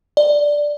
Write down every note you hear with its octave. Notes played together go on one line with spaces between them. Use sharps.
D5